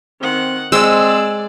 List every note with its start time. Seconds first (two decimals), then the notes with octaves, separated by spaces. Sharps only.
0.21 D#3 C4 F#5
0.72 G#3 C4 G#4 D5 E6